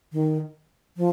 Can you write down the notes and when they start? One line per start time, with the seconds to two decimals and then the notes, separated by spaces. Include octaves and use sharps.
0.13 D#3
0.97 F3